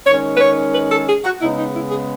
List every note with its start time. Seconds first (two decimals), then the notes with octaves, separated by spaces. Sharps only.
0.07 D#3 G#3 C#4 C#5
0.37 B4
0.41 C#5
0.74 B4
0.92 A4
1.08 G#4
1.24 F#4
1.42 C#3 G#3 B3 D#4 E4
1.58 D#4
1.76 E4
1.91 G#4